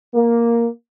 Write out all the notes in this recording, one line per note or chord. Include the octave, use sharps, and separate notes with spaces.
A#3